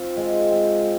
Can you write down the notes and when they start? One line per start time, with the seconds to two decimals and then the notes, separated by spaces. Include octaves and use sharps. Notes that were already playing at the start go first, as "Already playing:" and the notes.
Already playing: C4 F4
0.17 G#3
0.51 C4 F4